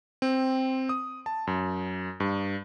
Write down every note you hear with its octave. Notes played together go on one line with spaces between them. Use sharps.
C4
D#6
A5
F#2
G2